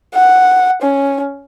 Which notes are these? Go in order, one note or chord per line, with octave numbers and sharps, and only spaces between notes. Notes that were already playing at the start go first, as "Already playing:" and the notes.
F#5
C#4